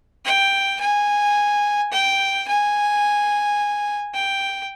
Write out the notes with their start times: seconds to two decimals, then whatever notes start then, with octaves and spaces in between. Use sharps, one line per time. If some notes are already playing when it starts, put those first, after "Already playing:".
0.25 G5
0.81 G#5
1.92 G5
2.48 G#5
4.14 G5